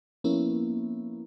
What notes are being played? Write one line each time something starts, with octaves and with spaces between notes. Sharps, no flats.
F3 A#3 B3 C#4 E4